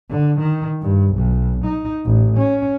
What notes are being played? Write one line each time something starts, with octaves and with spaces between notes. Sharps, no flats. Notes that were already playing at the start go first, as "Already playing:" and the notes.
D3
D#3
G2
B1
D#4
A1
C#4